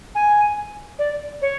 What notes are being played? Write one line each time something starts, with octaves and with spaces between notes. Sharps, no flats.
G#5
D5
C#5